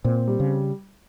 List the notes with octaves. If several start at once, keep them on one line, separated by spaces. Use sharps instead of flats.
A#2 C4
G3
C#3